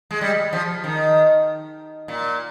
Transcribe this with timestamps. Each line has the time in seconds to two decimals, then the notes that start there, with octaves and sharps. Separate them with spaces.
0.11 G#3
0.21 G3
0.53 F3
0.84 D#3
2.08 A#2